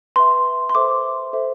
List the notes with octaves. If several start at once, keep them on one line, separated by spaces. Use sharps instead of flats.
B4 E5 C6
C6
A4 C5 E5 D6
A4 C5 E5